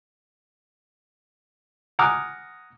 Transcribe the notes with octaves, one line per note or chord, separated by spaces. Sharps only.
F#5 G#5 A#5 D6 D#6 F6